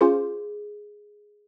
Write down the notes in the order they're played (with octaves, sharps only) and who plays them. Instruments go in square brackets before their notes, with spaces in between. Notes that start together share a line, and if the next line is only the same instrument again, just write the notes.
[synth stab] C#4 F4 C5 [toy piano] G#4